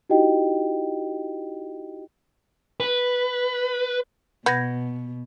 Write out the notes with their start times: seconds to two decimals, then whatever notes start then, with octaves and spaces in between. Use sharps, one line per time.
0.10 D#4 E4 F#4 G4 D#5 G5
2.80 B4
4.46 B2 B3 G6 G#6 A#6